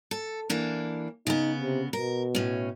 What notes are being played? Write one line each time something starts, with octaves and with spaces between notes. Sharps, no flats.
A4
E3 A#3 D4
C#3 B3 D#4
C3
B2 A#4
A2 C#4